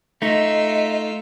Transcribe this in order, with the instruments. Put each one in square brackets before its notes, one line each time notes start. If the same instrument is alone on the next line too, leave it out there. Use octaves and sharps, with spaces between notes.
[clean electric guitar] A3 D#4 [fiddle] F4 E5 [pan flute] D#5